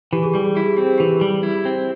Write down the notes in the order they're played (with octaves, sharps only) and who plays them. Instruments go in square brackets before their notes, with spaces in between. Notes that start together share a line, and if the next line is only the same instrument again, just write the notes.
[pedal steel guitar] E3 [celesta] G4
[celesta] G#4
[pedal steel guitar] G3 [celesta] G4
[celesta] G#4
[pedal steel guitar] E4 [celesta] G4
[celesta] G#4
[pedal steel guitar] C4 [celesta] G4
[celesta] G#4
[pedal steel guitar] E3 [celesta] G4
[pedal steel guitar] G3
E4
C4